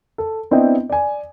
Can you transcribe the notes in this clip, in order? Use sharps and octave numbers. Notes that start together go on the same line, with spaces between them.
A4
B3 C4 D4 E4 D#5 G5
D5 G#5